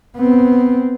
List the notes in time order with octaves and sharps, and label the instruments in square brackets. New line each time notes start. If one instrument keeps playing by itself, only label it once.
[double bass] B3 C4